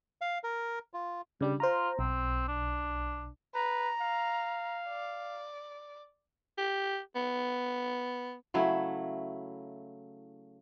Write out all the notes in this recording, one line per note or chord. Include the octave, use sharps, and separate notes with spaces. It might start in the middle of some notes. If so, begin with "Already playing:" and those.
F5
A#4
F4
C#3 G3 D4 G4
F4 C5 A#5
B1 C4
D4
B4 A#5
F5
D5
G4
B3
C#3 F#3 A3 E4